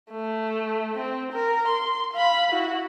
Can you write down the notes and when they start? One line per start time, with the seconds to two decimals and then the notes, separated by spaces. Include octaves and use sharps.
0.11 A3
0.98 C4
1.33 A#4
1.68 C6
2.13 F5 B5
2.52 E4 F#4